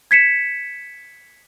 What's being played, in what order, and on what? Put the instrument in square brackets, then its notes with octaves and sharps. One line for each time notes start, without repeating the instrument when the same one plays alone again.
[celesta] G#6 B6 C#7 E7